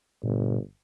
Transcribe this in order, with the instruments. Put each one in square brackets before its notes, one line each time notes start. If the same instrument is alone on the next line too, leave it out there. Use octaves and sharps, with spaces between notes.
[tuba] G1 [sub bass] A#2